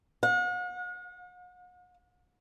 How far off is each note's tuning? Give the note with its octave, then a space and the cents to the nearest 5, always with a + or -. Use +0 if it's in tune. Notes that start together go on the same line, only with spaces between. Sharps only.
F#5 -45